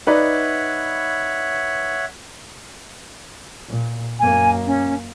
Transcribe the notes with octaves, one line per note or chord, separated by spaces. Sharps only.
D#4 B4 C#5 D5 E5 F#5
A#2
F#2 A#3 G#5
C#4